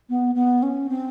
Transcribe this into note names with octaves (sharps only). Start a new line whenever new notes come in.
B3
B3
C#4
C4